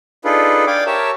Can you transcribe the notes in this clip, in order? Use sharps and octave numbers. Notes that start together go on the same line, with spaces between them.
D4 D#4 F4 G#4 A4 B4
D5 F5 G5 G#5 D6
G4 A#4 C#5 E5 A5